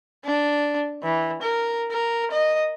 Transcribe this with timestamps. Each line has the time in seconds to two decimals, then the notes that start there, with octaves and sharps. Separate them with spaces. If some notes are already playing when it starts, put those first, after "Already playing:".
0.25 D4
1.03 E3
1.42 A#4
1.91 A#4
2.32 D#5